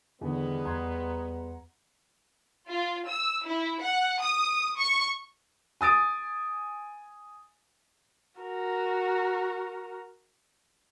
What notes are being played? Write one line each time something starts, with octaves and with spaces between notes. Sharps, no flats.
E2 D3 D#3 G3 G#3 B3
E2 F#5 A#5 C6 G#6
F4
E6
E4
F#5
D#6
C#6
G#5 D#6 A6 D7
F#4 A#4